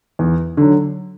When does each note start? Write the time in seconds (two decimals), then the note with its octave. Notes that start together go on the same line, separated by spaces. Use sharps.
0.19 E2
0.57 D3 F#3